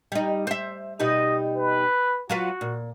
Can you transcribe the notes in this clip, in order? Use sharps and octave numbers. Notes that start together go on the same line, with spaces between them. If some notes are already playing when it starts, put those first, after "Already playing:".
G3 D#4
C5 E5
B2 G3 D#4 D#5
B4
F#3 F4 F#4 B4
A#2